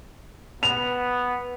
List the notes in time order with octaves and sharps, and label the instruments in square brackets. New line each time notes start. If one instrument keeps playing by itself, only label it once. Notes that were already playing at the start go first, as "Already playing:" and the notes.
[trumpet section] B3 [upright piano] F7